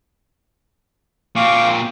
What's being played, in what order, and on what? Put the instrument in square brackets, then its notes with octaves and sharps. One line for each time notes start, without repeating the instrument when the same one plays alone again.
[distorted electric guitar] A#2 C4 [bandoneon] F5 C#6 D6